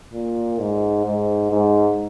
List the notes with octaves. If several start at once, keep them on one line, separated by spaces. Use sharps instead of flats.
A#2
G#2
G#2
G#2